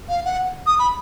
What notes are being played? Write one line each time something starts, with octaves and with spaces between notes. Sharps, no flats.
F5
F#5
D#6
B5